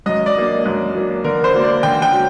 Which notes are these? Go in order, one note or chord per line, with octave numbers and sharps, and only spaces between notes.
F#2 D#5
D5
F#3 A#3 D4
F#2
F#3 A#3 D4
D3 A#4
C5
F#3 A#3 D4
D5
D3 G5
G5
F#3